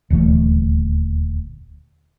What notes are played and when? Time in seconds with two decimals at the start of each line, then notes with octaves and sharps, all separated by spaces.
0.10 D#1 D2 E3 A3